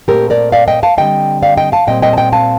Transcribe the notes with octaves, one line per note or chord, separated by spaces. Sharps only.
A#2 A3 C4 G4 A#4
A#4 D5
D5 F5
D#5 G5
F5 A5
D3 G3 C4 D#5 G5
D5 F5
D#5 G5
F5 A5
A#2 G3 C4 D#5 G5
D#5 G5
A5
D#5 G5
F5 A5